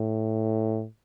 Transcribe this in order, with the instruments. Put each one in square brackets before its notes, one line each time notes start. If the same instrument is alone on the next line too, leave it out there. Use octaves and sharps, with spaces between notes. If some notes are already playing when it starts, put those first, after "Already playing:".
Already playing: [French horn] A2